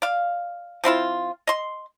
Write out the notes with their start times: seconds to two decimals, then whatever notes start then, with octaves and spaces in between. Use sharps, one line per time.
0.02 D5 F5
0.84 F3 C4 E4 F4
1.47 D#5 C6